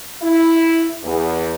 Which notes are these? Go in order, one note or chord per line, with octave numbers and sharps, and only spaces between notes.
E4
E2